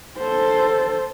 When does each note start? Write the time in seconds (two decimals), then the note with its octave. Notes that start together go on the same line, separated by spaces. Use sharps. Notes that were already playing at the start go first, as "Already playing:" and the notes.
0.18 A4 C5